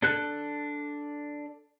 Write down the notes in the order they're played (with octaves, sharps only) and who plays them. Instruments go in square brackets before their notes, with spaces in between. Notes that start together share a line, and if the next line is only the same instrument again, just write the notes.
[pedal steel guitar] D4 A4 F#6